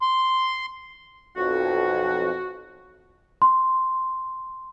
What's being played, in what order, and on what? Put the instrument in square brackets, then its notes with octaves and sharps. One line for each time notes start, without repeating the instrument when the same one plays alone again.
[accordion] C6
[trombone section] B1 F2 [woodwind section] F#4
[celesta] C6